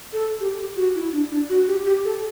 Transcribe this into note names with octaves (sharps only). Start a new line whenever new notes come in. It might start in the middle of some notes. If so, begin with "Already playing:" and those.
A4
G4
G4
F#4
E4
D4
D4
F#4
G4
G4
A4